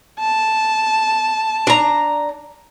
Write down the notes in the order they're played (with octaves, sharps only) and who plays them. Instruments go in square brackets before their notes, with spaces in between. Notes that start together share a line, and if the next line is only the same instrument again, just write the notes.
[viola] A5
[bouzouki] D4 A#5